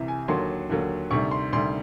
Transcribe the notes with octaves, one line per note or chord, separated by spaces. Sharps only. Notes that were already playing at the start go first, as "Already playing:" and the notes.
Already playing: C2 C3 E3
G#5
D#2 D3 F#3 A#3 C6
D#2 D3 F#3 A#3
D2 C3 D#3 G3 C#6
C6
D2 C3 D#3 G3 C6